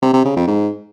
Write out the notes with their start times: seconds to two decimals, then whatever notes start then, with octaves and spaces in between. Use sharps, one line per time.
0.02 C3
0.14 C3
0.25 C#3
0.36 F2
0.48 G#2